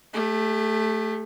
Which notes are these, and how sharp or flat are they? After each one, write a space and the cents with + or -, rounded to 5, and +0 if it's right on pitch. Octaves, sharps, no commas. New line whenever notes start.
A3 +0 G4 +40